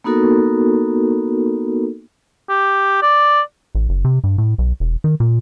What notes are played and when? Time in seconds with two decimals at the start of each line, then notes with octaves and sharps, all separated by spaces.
0.04 A#3 B3 D#4 F#4 A4 A#4
2.49 G4
3.02 D5
3.75 A1
3.89 F#1
4.05 C3
4.24 G2
4.38 A2
4.58 B1
4.80 E1
5.04 D#3
5.20 A#2